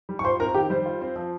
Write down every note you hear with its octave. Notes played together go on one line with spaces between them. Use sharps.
G3
C#6
F4 C5 C6
C4 A#4 A#5
D#3 G4 G5
G3 C5
F4
C4
F3